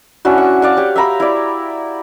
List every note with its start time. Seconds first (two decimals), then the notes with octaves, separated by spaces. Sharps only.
0.25 C#4 D4 E4 F#4
0.38 F#5
0.62 D5 F5 F#5
0.77 G4 C#5
0.96 E5 F5 A#5 B5
1.20 E4 D5